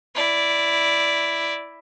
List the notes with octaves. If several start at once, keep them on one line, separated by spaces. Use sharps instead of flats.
E4 D5